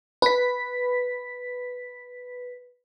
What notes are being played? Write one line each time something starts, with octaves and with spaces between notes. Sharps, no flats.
B4 B6